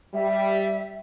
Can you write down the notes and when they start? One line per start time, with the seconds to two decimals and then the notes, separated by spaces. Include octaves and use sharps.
0.14 G3 E5